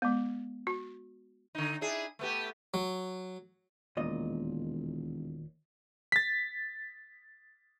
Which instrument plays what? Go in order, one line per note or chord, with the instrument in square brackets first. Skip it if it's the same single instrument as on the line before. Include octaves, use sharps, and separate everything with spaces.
[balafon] G#3 B3
F#4
[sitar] D3 D#4
D4 E4 G#4
A3 B3 G4
[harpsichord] F#3
[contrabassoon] E1 [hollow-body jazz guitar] D#2 A#2 D#5
[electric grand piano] A6 B6